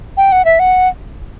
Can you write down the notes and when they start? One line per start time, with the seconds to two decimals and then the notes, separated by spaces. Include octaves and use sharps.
0.17 G5
0.32 F#5
0.45 E5
0.59 F#5